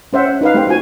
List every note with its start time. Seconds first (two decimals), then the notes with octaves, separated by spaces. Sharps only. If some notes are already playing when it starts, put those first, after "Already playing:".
0.13 C#4 C5 E5 F#5
0.41 D#4 B4 F5
0.54 A3 C4 G4 C5 G5
0.67 C4 F4 F#4 G#5